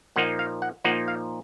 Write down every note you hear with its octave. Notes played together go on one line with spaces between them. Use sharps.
A#2 F3 A#3 D#4 F#5
F5
F#5
A#2 F3 A#3 D#4 F#5
F5